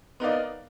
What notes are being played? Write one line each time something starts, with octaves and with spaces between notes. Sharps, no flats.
B3 D#4 A#4 D5 F5